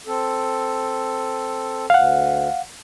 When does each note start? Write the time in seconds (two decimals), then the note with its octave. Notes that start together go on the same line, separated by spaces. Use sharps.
0.07 C4 A4
1.90 D2 F5 F#5